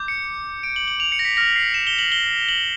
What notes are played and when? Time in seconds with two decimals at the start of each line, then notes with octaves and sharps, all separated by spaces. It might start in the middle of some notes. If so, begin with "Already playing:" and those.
Already playing: D6 G6
0.08 C#7
0.63 D7
0.76 F#7
0.88 F#7
1.00 F7
1.12 C#7
1.19 A#6
1.25 B6
1.37 D6 F6 A#6
1.56 C7
1.74 E7
1.87 G7
1.99 F#7
2.12 G7
2.49 F#7